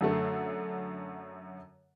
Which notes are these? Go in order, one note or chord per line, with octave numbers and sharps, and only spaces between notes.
F#2 D3 A3